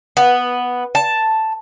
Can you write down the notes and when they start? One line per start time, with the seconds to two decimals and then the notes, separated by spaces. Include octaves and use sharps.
0.17 B3
0.95 A5